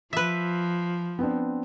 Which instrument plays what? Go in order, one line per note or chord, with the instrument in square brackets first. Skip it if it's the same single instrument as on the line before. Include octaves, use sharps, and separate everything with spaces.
[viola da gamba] F3 [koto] B4 E5
[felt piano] B3 C4 D4